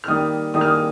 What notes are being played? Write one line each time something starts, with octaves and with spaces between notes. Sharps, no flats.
F6
D#3 G3 A#3 D#6
D#3 G3 A#3 D#6
F6
D#6